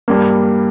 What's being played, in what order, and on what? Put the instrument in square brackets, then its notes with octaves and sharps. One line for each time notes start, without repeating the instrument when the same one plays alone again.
[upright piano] G2 G3 A#3